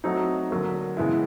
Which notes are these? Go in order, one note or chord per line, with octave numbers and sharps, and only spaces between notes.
F#3 A3 C4 D#4 F#4
D3 F#3 A#3
C#3 E3 G#3 B3 E4